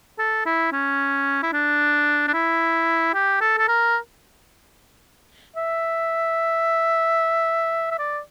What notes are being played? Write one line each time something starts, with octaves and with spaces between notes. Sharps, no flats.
A4
E4
C#4
E4
D4
D4
E4
G4
A4
A4
A#4
E5
E5
D5